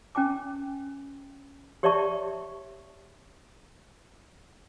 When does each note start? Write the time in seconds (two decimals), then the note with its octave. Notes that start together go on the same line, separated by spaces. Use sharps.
0.15 C#4 G5 G#5 D6
1.83 G4 C#5 D5 E5 A5 C#6